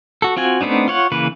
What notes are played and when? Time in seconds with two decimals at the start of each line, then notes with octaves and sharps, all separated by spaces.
0.22 F#4 A4
0.37 C4 F4 F#4 G#5
0.61 A3 B3 C4 D4 D#4
0.88 F4 C#5 F#5
1.12 C#3 E3 A#3 B4